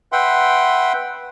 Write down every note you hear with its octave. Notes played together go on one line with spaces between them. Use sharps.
B4 E5 F#5 G5 C6